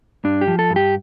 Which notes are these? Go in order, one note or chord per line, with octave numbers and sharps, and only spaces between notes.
G2 D4
G4
F3
A4
G2
G4